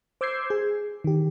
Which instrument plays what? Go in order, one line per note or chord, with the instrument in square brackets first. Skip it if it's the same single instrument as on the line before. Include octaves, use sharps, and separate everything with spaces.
[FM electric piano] C5 D6 E6 G6 G#6 C7
G#4
D#3 G4